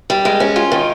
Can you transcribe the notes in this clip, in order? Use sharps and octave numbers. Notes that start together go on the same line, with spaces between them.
G3
G#3
C#4
F4
D#3